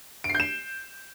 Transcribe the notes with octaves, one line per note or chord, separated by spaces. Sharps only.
D7
C7
G6
E7